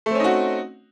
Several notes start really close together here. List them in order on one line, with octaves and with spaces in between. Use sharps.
A3 C4 C#4 D#4 F#4